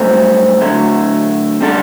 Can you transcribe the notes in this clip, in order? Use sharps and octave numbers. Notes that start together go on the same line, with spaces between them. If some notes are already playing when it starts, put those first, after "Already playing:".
Already playing: G2 F#3 A3 C4
D3 F#3 A3
C3 G3 D4 A4